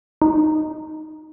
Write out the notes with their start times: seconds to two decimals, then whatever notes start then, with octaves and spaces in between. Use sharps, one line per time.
0.22 D#4